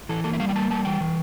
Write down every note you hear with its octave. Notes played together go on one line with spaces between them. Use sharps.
E3 A4
A#3 A4
E5
G3 F5
G5
A#3 A5
G3 A5
E3 G5
E3